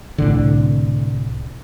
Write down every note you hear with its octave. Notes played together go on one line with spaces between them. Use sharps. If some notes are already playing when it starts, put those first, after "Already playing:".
C2 A2 D3